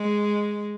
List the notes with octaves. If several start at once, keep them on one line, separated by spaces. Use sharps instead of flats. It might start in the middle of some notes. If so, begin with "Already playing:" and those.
Already playing: G#3